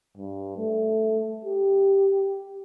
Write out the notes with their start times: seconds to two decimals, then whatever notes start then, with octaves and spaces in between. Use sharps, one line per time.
0.17 G2
0.58 A3
1.45 G4